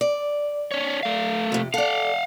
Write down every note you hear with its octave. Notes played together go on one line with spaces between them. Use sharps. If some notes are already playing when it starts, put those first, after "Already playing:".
D5
D4 C#5
A3 F5
F2 C3
A4 D5 F5 F#5